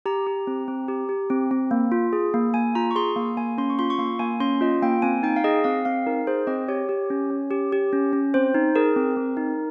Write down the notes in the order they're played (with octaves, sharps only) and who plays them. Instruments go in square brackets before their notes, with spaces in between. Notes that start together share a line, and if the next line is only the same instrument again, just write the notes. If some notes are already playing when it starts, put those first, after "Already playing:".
[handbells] G4 A#5
G4
C4
C4
G4
G4
C4
C4
A#3
F4
G#4
A#3
A#3 G#5
F4 A#5
C#6
G#4 C6
A#3 C6
A#3 G#5
C#4 C6
C#6
F4 C6
C#6
A#3 C6
A#3 G#5
C#4 C6
F4 D#5
A#3 G5
C4 G#5
D#4 G5
F5
G#4 D#5
C4 F5
C4 F5
D#4 A#4
G#4 C5
C4 D#5
G4 C#5
G4
C#4
C#4
G4
G4
C#4
C#4
C4 C5
D#4
G#4 A#4
C4
C4
D#4